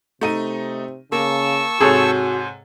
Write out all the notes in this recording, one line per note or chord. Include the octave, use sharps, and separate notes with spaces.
C3 A3 D#4 D#7
C#3 A#3 A5 C#6 E6
G#2 C3 F#4 G#4 A4 C#5